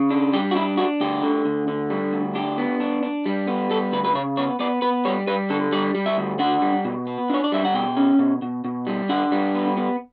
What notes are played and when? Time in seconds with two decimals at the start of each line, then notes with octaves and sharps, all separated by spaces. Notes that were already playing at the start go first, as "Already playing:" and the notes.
Already playing: C#3
0.11 D4
0.33 G3 G4
0.51 F#4
0.55 D4 E4
0.77 D4 F#4
1.01 D2 G4
1.23 D3
1.46 D2
1.68 D3
1.90 G3
2.13 D2
2.35 D4 G4
2.58 B3
2.80 D4
3.03 D4
3.26 G3
3.47 B3
3.70 G3 A4
3.92 D2 B4
4.04 B4
4.15 C#3 C#5
4.37 B3 C#5
4.59 B3 D5
4.82 B3 B4
5.05 G3 C#5
5.27 G3 B4
5.50 D3 A4
5.72 G3 D5
5.95 G3
6.06 E5
6.18 D2
6.39 D4 F#5
6.62 G3
6.85 B2
7.07 B3
7.30 D4 C#5
7.44 D5
7.52 G3 E5
7.65 F#5
7.74 B2 G5
7.97 C#4
8.19 B2
8.42 B2
8.64 B2
8.87 G3
9.09 D4 F#5
9.32 G3
9.55 B3
9.77 B3